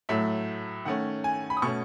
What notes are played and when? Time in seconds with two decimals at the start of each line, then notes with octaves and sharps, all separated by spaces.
0.09 A2 F#3 A3 E5
0.85 D#3 A3 C#4 F#5
1.24 G#5
1.50 B5
1.57 D#6
1.62 B2 A3 C#4 C#6